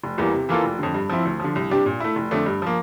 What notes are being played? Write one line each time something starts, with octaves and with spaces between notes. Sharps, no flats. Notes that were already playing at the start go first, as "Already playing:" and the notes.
F1
E2 E3 G3 A#3
C3
E3 A#3 F4 A4
F1
F2 D3
G2
F3 C4 E4
D2
D3 F3
C2
C3 G3 D4 G4
A#2
A3 E4
F1
F2 D3 A3 D4
G2
F3 A#3